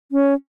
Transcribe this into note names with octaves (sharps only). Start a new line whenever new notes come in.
C#4